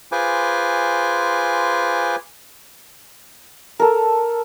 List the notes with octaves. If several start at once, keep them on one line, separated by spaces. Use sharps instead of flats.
F4 G#4 B4 C5 G#5 D6
A4 A#4